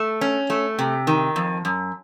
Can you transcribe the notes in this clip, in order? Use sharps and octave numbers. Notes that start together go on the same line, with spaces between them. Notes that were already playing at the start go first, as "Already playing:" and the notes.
Already playing: A3
C#4
A3
C3
D#3
F2
F#2